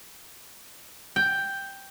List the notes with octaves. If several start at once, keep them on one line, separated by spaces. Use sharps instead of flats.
G5